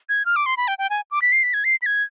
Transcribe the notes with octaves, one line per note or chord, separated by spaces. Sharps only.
G#6
F6
D6
C6
B5
G5
G5
G#5
D6
B6
C7
B6
G#6
C7
B6
G#6